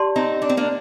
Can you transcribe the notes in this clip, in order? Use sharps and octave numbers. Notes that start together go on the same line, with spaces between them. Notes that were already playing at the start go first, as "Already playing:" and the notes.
Already playing: G4 D5 A5 C6
C4 D#4
D4
C4
A#3 D4